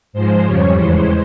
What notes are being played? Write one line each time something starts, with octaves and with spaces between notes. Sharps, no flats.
G#2 F3 G#3 C5
F2 C#3 G3 C#5
E2 E3 G#3 C5